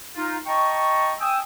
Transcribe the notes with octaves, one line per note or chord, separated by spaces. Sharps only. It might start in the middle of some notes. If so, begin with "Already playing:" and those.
D#4 F4
D#5 G5 A5 A#5 C#6
G5 G#5 D#6 E6